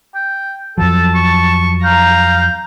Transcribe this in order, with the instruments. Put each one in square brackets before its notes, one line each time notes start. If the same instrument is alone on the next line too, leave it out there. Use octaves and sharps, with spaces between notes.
[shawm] G5
[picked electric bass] F2 F3 F#3 [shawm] A4 [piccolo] A5
[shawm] C#6
[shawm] F5 [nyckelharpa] A#5 [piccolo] G6